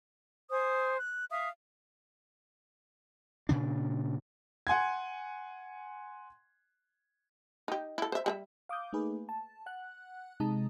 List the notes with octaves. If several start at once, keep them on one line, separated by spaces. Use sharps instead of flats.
C5 G#5 D#6
F#6
E5 F5 D#6
A#2 C#3 D4
F#5 G#5 C6 G#6
D#4 G4
E4 A4
C5 E5
G3 G#4 E5
F5 D6 D#6 G6
A3 A#3 D#4 G#4 B4
A5
F#5 F#6
C3 G#3 D#4 A5 A#5 D#6